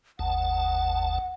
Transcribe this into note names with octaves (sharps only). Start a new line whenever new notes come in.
G1 D#2 F#5 A5